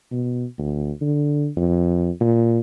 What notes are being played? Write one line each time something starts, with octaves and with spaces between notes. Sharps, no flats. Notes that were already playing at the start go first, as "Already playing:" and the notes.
B2
D2
D3
F2
A#2